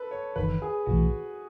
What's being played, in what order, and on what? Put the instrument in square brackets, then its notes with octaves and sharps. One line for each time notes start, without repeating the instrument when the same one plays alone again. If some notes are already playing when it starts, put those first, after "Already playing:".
Already playing: [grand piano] A4 B4
C#5
[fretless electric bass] F#1 E2 D#3 [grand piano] B4
[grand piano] G#4
[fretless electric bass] B1 A2 E3 [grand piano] F#4